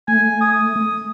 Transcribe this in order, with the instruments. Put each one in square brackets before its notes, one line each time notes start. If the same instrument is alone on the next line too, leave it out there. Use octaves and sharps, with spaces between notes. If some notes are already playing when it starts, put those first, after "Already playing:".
[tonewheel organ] A3 [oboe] G#5
[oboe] D#6